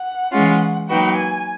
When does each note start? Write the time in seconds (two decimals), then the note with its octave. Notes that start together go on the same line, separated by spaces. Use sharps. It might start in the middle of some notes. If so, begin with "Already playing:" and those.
Already playing: F#5
0.31 E3 G#3 C#4 F4
0.89 F#3 A#3 D#4 F#4 B4 G5
1.17 G#5